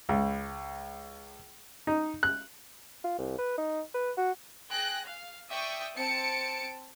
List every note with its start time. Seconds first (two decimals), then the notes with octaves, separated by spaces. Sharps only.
0.09 C#2
1.87 D#4
2.23 F#6
3.04 F4
3.18 C2
3.38 B4
3.58 D#4
3.94 B4
4.18 F#4
4.70 G#4 G5 F#6 A#6
5.04 F5
5.50 D5 E5 G5 C#6 D#6
5.95 C4 A5 C#7 D7